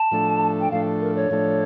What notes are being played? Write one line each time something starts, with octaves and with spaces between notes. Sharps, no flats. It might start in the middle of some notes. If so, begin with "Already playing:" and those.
Already playing: A5
A2 F3 A3 D4 A4
G5
A2 F3 A3 D4 A4 F5
A#4
C#5
A2 F3 A3 D4 A4